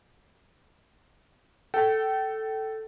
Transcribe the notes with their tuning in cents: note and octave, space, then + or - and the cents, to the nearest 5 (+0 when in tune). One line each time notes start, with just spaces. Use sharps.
A4 +0 G5 -30